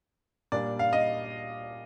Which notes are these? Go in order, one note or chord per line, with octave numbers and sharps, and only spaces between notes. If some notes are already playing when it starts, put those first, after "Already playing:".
A#2 G3 A#3 D4 D5
F5
D#5